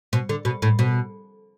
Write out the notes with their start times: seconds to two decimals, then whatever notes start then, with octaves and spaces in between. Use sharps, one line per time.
0.13 B2
0.29 D3
0.45 B2
0.62 A2
0.79 B2